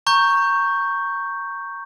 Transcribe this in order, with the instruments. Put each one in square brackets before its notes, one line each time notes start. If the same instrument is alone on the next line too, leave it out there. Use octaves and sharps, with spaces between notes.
[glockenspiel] A#5 C#6 G6